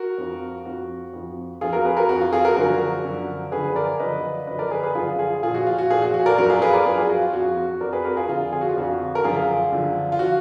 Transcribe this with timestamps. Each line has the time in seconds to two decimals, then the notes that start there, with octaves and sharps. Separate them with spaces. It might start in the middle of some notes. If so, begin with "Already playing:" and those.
Already playing: F#4 A#4
0.18 F2 F3
0.65 F2 F3 F#4
1.13 F2 F3
1.61 F2 F3 F4 G#4
1.73 F#4 A#4
1.85 G#4 B4
1.97 F#4 A#4
2.09 F2 F3 F#4
2.21 F4
2.32 F4 G#4
2.45 F#4 A#4
2.56 F#2 D3 F3 F#4 A#4
3.04 F#2 D3 F3
3.52 F#2 D3 F3 G#4 B4
3.69 B4
3.76 A#4 D5
4.00 F#2 D3 F3 B4 D#5
4.47 F#2 D3 F3 B4 D#5
4.59 A#4 D5
4.71 G#4 B4
4.83 G#4 B4
4.95 F#2 D3 F3 F4 G#4
5.19 F4 G#4
5.43 A#2 F3 F4 G#4
5.55 F#4
5.67 F4
5.78 F#4
5.90 A#2 F3 F4 G#4
6.02 F#4
6.14 F#4
6.26 A#4 D5
6.38 F#2 F3 F#4 A#4
6.49 F4 G#4
6.62 G#4 B4
6.73 A#4 D5
6.85 F#2 G#4 B4
6.89 F3
6.98 F4 G#4
7.09 F#4
7.22 F4
7.33 F2 F3 F#4
7.57 F#4
7.81 F2 F3 A#4 D5
7.93 G#4 B4
8.05 F#4 A#4
8.17 F4 G#4
8.28 F2 D3 F3 F4
8.53 G#4
8.61 F#4
8.69 F4
8.77 F2 D3 F3 F#4
9.15 A#4
9.24 F#2 D3 F3 F4 G#4
9.72 F#2 D3 F3
10.12 F4
10.19 F3 F#4